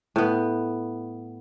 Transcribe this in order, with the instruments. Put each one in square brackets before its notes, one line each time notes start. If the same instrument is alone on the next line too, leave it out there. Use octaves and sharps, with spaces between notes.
[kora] A2 B3